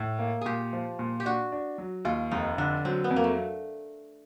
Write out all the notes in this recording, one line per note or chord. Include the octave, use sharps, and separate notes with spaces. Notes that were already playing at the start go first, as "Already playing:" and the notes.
Already playing: A2
A#3
A#2 G4 G#4
F3
A#2
G4
D4 F#4
D4
F#3
D#2 F4
F1 D#4
D3 D4
F#3 C4
B3
F2
A#3
A3